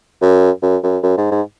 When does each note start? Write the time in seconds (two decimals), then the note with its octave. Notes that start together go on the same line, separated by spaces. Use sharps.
0.22 F#2
0.62 F#2
0.83 F#2
1.03 F#2
1.18 G#2
1.31 G#2